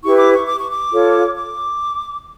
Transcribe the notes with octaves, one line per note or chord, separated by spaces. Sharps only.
E4 G4 B4 C#6
D6
C#6
D6
C#6
D6
F4 A4 C#5
D6